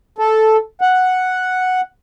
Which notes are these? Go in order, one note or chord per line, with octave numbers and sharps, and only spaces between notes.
A4
F#5